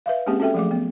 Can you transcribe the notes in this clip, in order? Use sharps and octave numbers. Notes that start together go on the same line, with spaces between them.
B4 E5 F5
G#3 A#3 C4 C#4 G4 G#4
C#4 F#4 A4 E5 G5
F3 F#3 A3 G#4 D6
B3